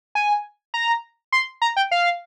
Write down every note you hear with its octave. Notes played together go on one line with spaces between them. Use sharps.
G#5
A#5
C6
A#5
G5
F5